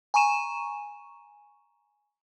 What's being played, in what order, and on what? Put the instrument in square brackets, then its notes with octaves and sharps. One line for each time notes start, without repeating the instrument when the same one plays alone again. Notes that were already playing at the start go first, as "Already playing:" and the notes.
[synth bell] G#5 A#5 C#6 D#7 E7